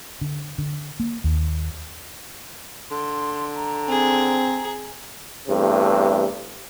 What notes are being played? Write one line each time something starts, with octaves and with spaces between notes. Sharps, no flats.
D3
D3
A#3
D#2
D3 C6
A#5
C4 G#4
E2 G2 C3 A3